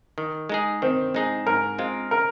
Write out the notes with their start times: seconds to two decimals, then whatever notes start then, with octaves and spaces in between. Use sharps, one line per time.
0.18 D#3
0.49 G#3 D#4 G#4
0.82 D#3 C4
1.14 G#3 D#4 G#4
1.46 G#2 A#4
1.78 G#3 C4 F4
2.11 A#4